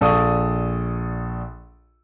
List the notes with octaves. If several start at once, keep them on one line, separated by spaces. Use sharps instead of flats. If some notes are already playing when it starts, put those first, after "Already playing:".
A#1 A4 D5 F5 C#6 D#6